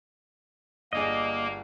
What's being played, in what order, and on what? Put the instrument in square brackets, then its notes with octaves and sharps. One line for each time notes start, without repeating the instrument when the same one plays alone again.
[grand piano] G1 D4 G#4 [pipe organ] A#3 [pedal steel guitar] D#5